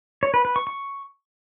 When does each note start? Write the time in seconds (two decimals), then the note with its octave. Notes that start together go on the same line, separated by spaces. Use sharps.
0.23 C#5
0.34 B4
0.45 B4
0.56 C#6
0.67 C#6